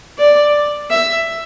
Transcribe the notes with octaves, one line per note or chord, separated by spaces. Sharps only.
D5
E5